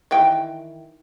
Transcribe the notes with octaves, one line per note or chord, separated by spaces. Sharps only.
D#3 E3 G5